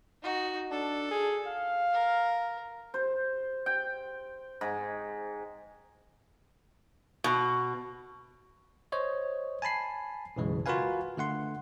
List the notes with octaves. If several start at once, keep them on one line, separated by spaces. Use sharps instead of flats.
D#4 F#4
D4 A4
G#4
F5
A#4
C5
G5
G#2
B2
C5 C#5 D#5
G#5 A5 B5 C7
B1 F#2 C#3 E3 G#3
F4 F#4 A#4 B4 F5 G#5
D3 A3 F#5 C6